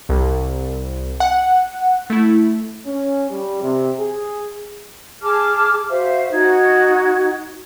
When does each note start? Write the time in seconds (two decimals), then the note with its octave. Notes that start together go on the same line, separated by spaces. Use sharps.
0.09 C2
1.20 F#5
2.10 A3 E4
2.86 C#4
3.31 G3
3.62 C3
3.99 G#4
5.22 G#4 A5 D6 F6
5.90 F#4 C5 E5 F5
6.32 D#4 F#4 G#6